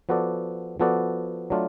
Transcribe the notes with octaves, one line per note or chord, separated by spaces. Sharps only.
F3 B3 F#4 A4 D5
F3 B3 F#4 A4 D5
F#3 A3 D4 F4